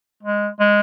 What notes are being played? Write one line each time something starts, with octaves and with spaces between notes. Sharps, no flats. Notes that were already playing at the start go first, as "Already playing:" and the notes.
G#3
G#3